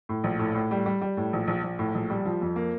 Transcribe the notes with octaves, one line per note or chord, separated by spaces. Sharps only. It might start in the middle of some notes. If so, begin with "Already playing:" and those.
A2
A#1
A2
A2
G3
G3
G3
A2
A#1
A#1
A#1
A2
A#1
G3
F3
F2
A#3